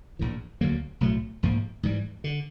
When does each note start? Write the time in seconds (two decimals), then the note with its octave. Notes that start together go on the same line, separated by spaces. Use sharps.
0.19 A#1 A2 E3
0.61 D2 D3 F#3 A#3
1.01 B1 A2 F#3 A3
1.43 A#1 G#2 F3 A#3
1.83 G#2 E3 G3
2.24 D3